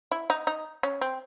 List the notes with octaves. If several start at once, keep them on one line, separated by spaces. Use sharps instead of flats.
E4
D#4
D#4
C#4
C4